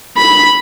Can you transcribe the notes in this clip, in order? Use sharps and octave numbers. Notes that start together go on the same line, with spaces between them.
B5